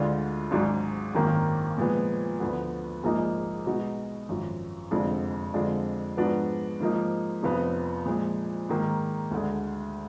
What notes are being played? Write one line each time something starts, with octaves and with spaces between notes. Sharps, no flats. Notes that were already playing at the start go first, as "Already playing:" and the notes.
Already playing: D2 D3 G#3 D4 F4
G#1 G#2 F#3 D4 G#4
G#1 F#2 D#3 A#3
A#2 F3 G#3 B3
D2 D3 F3 B3
A#1 G#2 F3 A#3 D#4
B2 G#3 D#4 F#4
G#1 F#2 F3
F1 F2 D3 G#3 D4
F2 D3 G#3 D4 F4
G#2 F3 B3 D4 F#4
G#2 F3 A#3 D#4
F1 F2 F3 B3
A#2 F3 G#3
G#2 D#3 A#3
D2 D3 G#3